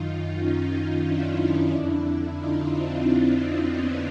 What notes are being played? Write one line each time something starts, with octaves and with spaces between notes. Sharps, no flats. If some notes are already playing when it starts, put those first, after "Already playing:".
Already playing: F#2 D#3 D#4 F4
C#4 D#4
D4 E4
F2 D3
D#4 F4
C4 D4
B3 C#4